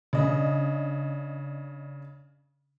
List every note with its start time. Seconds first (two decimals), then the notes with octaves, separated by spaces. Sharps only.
0.13 C#3 D4 D#5